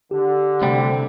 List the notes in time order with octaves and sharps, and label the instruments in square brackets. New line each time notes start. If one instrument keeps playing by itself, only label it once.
[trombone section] D3 [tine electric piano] G4
[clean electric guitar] D2 G3 [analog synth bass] C3